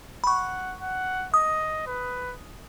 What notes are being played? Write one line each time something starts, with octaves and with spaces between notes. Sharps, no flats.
B5
F#5 C#6
F#5
D#5 D#6
B4